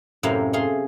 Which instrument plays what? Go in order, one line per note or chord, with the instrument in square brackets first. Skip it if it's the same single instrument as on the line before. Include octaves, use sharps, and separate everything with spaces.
[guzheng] F#2 A2 C3 A#3 C#5 F5
A3 G#4 F5 C6